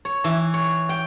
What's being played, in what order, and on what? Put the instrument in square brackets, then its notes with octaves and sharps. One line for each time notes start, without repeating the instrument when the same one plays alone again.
[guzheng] C#5
E3
C#5
G5